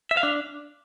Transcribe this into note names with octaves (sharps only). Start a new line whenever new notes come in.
E5
F5
D4